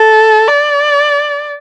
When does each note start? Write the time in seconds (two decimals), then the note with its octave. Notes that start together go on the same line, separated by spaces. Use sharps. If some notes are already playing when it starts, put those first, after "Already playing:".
Already playing: A4
0.48 D5